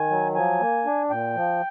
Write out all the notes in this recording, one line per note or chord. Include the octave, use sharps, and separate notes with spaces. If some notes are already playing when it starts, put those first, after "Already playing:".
Already playing: D#3 G#5
F#3
F3 G#5
A#3
D4
A#2 G5
F3